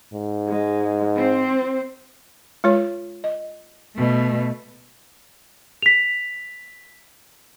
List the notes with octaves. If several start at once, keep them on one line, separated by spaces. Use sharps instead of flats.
G#2
G#3
C4 C5
G#3 F4 C#5
D#5
B2 A3
B6 F7